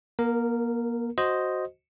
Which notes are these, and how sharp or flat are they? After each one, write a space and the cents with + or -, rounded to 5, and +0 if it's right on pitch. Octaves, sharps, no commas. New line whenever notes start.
A#3 +35 A#4 -10
F#4 +0 C5 +0 D#5 +0